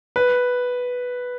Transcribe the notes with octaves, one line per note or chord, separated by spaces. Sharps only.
B4